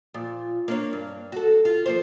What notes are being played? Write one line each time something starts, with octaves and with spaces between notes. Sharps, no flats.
A#2 F3
A#3 D4 C#5
G2
F#4 A4
F4
F3 A#3 C5